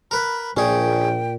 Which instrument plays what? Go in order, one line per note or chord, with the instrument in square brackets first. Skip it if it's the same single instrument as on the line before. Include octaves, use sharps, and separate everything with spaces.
[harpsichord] A#4 B4 [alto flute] B5
[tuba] A#1 [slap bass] A#2 [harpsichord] C#4 G#4 [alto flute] G5